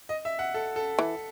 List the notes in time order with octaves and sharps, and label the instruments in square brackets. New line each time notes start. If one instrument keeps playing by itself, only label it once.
[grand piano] D#5
E5
F#5
A4
A4
[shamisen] E3